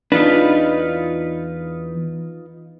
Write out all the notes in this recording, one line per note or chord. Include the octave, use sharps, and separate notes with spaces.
E2 D4 D#4 F4 B4